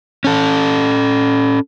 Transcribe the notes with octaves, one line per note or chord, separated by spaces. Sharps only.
C#4 A4